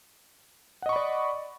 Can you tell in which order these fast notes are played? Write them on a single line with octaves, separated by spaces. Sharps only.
F#5 D#5 C#6 B5 D5